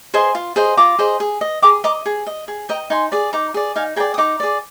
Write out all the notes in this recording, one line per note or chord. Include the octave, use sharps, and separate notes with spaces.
G#4 C5 D#5 G#5 C6
F4
G#4 C5 D#5
F4 A#5 D6
G#4 C5 D#5
G#4
D#5
G#4 A#5 D6
D#5 A#5 D6
G#4
D#5
G#4
D#5 G5 A#5
D#4 G#5 C6
G#4 D5
D#4 A#5 D6
G#4 D5
D#4 F5 G#5
G#4 D5 G5 A#5
D#6
D#4 A#5 D6
G#4 D5